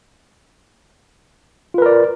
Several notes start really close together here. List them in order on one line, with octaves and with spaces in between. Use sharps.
F4 B4 A#4 D5